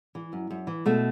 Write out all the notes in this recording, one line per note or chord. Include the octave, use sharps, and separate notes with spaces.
E3
F#2
F#2
E3
B2 A3